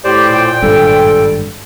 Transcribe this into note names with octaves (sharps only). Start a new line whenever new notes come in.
A2 G4 C5 D5
F2 A#2 G5
G#1 G2 G3 A4